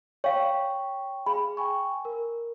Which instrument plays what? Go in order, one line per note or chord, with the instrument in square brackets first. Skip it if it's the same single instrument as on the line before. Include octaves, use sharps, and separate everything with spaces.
[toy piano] C#5 F5 [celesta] G5 C#6
[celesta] G#4 F5 [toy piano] B5
[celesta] G5 G#5 C#6
A#4